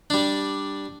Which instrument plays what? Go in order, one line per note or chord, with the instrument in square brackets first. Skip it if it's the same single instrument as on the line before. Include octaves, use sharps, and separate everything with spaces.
[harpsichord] G3 D4